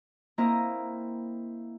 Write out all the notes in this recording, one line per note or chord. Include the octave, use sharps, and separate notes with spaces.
A#3 C4 E4 D#5 A#5